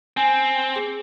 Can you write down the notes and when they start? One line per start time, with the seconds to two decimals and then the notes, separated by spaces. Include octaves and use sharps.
0.17 C4 G#5
0.76 G#4